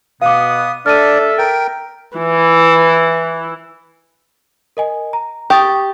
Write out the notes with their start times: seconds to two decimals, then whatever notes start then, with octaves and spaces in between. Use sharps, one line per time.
0.22 B2 B3 F5 D6 D#6
0.86 D4 A4 D5 E5 F6 D#7
1.38 A#4 G5
2.17 E3 E4
4.77 A#4 D#5 G#5
5.13 A#5
5.50 G4 C#6 D#6 A6